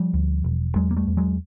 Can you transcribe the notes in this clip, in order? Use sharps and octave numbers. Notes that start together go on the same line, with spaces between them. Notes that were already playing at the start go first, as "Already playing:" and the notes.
Already playing: F3 G3
D2
E1
E2 F#3 G#3
A#3
G3 A3
E2
F#3 G#3